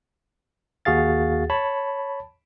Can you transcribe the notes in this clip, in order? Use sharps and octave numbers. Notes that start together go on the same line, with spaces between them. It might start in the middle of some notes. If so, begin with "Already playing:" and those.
D#2 F#4 G#4 F5 A6
C#5 A5 B5